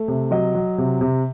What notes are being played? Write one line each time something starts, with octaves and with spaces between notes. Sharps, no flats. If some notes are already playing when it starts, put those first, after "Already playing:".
Already playing: A3
C3
F#3 D#5
F#3
C3
C3